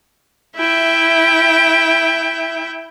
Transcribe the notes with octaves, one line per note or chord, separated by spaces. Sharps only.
E4 E5 G5